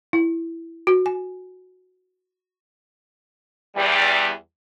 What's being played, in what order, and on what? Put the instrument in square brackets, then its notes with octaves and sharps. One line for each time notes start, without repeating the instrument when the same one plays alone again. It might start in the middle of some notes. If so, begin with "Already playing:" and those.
[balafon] E4
F#4
G#5
[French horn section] E2 G3